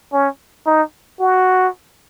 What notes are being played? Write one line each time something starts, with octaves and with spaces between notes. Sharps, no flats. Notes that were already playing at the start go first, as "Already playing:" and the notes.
C#4
D#4
F#4